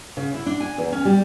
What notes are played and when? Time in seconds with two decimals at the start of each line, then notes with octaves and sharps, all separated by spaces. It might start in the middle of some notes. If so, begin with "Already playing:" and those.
0.17 C#3
0.34 E4
0.46 D4
0.60 G#5
0.78 E2
0.92 C#4
1.05 G3